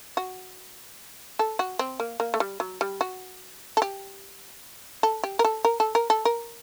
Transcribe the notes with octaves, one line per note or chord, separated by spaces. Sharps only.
F#4
A4
F#4
C4
A#3
A#3
A3
G3
F#3
G3
F#4
A4
G4
A4
G4
A#4
A4
A#4
A4
A#4
A4
A#4